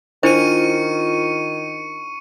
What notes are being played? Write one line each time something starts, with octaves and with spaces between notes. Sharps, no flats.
D#3 D4 E4 F4 C5 C#6 C#7 D#7